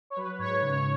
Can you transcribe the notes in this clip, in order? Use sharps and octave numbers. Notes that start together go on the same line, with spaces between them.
C#5
F#3 B4
G#2 C#5
C#3 C#5